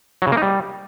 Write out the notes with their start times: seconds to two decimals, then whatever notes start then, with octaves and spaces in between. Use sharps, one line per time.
0.22 F#3
0.27 C#3
0.32 A#3
0.37 D#4
0.42 G3